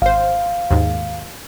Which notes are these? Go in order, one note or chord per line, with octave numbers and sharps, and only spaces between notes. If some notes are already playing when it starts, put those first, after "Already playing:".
G#1 C5 F5
D#2 G#2